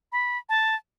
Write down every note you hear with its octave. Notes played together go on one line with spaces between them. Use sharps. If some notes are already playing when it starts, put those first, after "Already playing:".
B5
A5